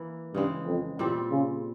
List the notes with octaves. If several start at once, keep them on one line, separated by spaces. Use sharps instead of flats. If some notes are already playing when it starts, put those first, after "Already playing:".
Already playing: E3 A#3 E4
G2 C#3 E3 G#3
F2
E2 A#2 G3 C4 G4
C#3